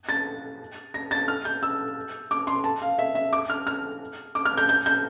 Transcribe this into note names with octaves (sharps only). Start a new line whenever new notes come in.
A6
A#6
A6
F6
G6
E6
D6
C6
A5
F5
E5
E5
D6
F6
F6
D6
F6
G6
G6
G6